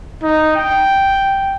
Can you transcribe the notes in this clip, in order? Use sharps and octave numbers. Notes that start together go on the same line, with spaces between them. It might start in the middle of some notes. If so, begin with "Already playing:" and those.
D#4
G5